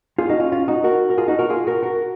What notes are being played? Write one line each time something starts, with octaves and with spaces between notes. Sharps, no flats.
F4 G#4
D#4 F#4
C#4 F4
C#4 F4
D#4 F#4
F#4 A#4
A#4
F4 G#4
D#4 F#4
F#4 A#4
F4 G#4
F#4 A#4
F#4 A#4